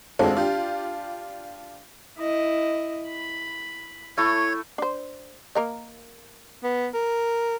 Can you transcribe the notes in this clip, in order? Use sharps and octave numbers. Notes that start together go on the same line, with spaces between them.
G#3 C4 D4 F4 F#4 A4
D4 F4 G4
E4 D#5
B5
A3 E4 C#5
D4 C5
A#3 A#4 D#5
B3
A#4